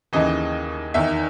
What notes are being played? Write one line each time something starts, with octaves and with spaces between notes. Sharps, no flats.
D#2 C#3 E3 D#5
E2 D#3 E5